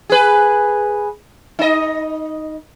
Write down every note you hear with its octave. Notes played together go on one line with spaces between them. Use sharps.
G#4 B4
D#4 D#5